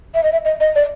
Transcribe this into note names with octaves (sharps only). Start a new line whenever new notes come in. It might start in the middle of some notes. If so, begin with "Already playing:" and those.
E5
D#5
E5
D#5
D#5
D5